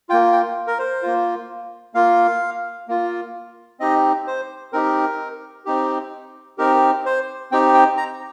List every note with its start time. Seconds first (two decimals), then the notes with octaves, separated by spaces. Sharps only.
0.09 F4 G5
0.13 A#3
0.33 G5
0.67 A#4
0.79 C5
1.02 A#3 F4
1.94 A#3 F4 F5
2.88 A#3 F4
3.80 C4 D#4 G4 D#5
4.27 C5
4.73 C4 D#4 G4 A#4
5.65 C4 D#4 G4
6.58 C4 D#4 G4 A#4
7.05 C5
7.52 C4 D#4 G4 G5
7.74 G5
7.97 A#5